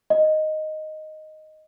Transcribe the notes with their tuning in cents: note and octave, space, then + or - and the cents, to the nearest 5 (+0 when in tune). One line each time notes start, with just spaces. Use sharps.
D#5 +0